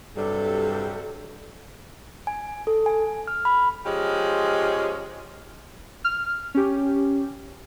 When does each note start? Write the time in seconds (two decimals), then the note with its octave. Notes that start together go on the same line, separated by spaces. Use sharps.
0.16 G2 C3 F#3 G3 A4
2.27 G#5
2.67 A4
2.86 G#5
3.27 F6
3.45 B5
3.85 F3 G#3 C#4 G4
6.04 F6
6.55 C#4 G4